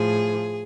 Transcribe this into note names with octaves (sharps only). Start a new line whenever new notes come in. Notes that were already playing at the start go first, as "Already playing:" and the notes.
Already playing: A2 F3 G#4